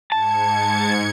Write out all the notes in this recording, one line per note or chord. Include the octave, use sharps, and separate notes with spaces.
G#2 A5 G#6 C#7